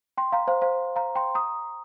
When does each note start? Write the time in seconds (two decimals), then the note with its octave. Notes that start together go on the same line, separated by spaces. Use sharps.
0.17 G5 C6
0.32 F5 A#5
0.47 C5 F5
0.62 C5 F5
0.96 F5 A#5
1.15 G5 C6
1.35 A#5 D#6